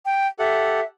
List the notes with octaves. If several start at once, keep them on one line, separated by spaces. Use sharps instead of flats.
G5
G4 A4 E5 F#5